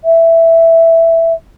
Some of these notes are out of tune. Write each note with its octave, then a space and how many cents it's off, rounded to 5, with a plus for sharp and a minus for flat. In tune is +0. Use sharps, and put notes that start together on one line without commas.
E5 +5